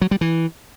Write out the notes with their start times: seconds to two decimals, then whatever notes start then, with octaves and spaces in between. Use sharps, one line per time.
0.01 F#3
0.11 G3
0.21 E3